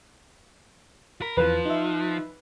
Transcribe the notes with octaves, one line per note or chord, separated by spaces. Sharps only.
A#4 B5 B6
E2 E3 F3 B4
D#4 E5